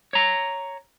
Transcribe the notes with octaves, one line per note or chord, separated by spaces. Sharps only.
C#5 A#5